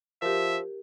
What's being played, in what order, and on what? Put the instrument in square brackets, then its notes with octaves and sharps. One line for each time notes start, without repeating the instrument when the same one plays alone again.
[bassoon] F3 [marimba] G4 A#4 [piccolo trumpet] E5